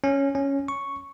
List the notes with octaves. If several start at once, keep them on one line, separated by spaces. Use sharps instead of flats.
C#4
C#4
C#6